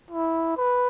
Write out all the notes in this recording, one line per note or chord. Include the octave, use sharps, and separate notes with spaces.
E4
B4